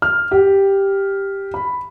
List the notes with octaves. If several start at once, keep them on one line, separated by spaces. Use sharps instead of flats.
F6
G4
B5